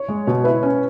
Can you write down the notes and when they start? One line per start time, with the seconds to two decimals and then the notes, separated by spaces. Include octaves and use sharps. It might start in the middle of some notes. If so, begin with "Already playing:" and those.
Already playing: C#5
0.08 G#3
0.27 B2
0.44 E4 B4
0.63 C#4